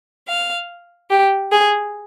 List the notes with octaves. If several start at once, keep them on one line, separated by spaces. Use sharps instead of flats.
F5
G4
G#4